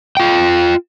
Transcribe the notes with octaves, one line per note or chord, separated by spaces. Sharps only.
F4 G5